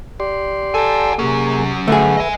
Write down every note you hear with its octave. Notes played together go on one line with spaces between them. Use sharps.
G4 D5 C6
A4 F#5 G#5
C3 F#3 A#3 C#4 G#4
D3 A3 G#4 B4 E5
D#5 G#5